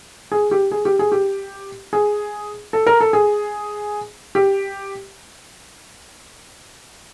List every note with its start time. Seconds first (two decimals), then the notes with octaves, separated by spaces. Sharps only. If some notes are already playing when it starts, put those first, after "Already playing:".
0.32 G#4
0.51 G4
0.71 G#4
0.85 G4
0.99 G#4
1.12 G4
1.93 G#4
2.73 A4
2.87 A#4
3.00 A4
3.13 G#4
4.35 G4